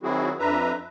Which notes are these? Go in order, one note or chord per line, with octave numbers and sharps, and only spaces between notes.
D#3 F#3 C4 E4 F#4 G#4
F2 D4 B4 E5 A#5